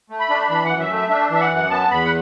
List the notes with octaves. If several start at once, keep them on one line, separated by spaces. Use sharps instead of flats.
A3
B5
D4
E3 B5
F#5
F#2
E5
A3 E5
D4 E5
E3 E5
F#5
F#2
F#5
B3 A5
E2 B5
F#5